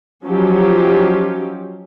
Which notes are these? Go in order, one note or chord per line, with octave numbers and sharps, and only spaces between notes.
F3 F#3 C#4 D#4 F4 G4